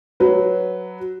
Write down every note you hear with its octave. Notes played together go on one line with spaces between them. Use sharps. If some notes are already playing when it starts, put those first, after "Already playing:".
F#3 B4